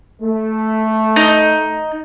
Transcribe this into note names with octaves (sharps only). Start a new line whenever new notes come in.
A3
D#4